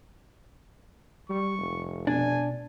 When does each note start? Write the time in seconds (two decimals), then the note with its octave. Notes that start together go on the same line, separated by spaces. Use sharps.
1.30 G3 C#6
1.59 F1
2.07 B2 D4 G#5